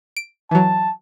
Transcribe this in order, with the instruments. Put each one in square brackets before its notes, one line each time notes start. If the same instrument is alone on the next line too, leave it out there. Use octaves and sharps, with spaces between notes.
[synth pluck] D7
[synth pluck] E3 F#3 [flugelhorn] A5